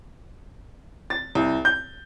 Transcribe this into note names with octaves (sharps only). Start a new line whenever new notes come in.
A6
C2
G6